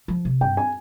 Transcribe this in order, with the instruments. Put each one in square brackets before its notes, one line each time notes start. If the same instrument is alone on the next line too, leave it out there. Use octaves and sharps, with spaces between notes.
[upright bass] F3
C3
[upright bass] G2 [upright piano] G5
[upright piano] G#5